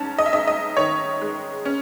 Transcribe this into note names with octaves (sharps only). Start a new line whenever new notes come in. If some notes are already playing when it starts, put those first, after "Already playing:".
Already playing: G#2 C#4 A5
D#5
E5
G#2 D#5
D#5
D#3 C#5
G#3
C#4